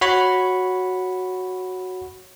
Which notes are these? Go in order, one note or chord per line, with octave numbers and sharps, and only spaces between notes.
F#4 C#5 B5 C#6